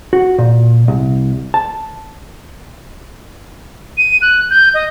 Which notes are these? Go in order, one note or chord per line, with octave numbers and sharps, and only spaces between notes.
F#4
A#2
C2
A5
D#7
F#6
G6
D#5